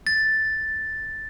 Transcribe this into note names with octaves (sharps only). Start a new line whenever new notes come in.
A6